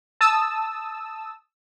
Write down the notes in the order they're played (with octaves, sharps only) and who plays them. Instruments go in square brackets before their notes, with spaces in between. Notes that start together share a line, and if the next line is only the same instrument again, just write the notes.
[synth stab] A5 D#6 E6